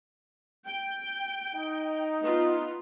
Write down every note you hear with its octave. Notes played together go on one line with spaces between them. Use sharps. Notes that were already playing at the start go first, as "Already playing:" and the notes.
G5
D#4
B3 F4